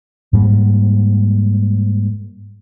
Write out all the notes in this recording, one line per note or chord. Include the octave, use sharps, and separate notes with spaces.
G#2 G3 A#3